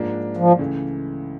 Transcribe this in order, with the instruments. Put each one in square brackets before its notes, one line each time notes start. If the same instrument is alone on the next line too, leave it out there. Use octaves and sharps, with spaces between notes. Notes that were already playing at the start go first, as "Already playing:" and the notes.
Already playing: [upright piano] G#2 F3 A#3 D4
[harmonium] F3
[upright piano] C#2 C#3 E3 A3